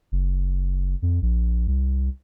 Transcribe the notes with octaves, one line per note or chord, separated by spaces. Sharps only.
F#1
F2
A#1
C2